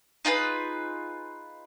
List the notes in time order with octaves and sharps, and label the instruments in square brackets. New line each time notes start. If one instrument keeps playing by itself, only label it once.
[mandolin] D#4 F4 G#4 B4